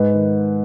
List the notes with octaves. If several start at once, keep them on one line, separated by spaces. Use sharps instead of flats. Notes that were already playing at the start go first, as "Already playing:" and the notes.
Already playing: G#2 B4
D#3